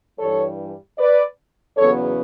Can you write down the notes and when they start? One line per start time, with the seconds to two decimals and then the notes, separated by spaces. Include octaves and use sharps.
0.19 G2 E3 G3 A4 C#5
0.98 B4 D5
1.77 E2 C#3 F#3 B3 A4 C#5